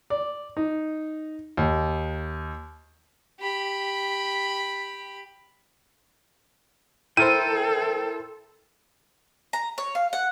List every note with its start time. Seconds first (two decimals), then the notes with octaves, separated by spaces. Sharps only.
0.10 D5
0.57 D#4
1.57 D#2
3.40 G4 B5
7.17 E4 A4 A#4 C5 G5 D#7
9.53 A#5
9.78 C#5
9.95 F5
10.13 F#5